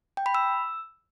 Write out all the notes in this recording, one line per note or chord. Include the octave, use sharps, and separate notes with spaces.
G5
B5
E6